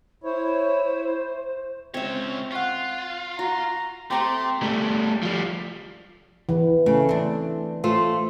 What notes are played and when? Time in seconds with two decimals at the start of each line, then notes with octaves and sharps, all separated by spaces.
0.24 E4 C5 C#5
1.94 C#2 C4 C#5 E5
2.52 F4 F#5 C#6
3.39 F#4 A#5
4.11 A3 C4 G4 A#5 C6 D6
4.63 G3 A3
5.23 F3 G3
6.49 E3
6.86 C#3 A3
7.09 C4 D4
7.84 A3 F4 C5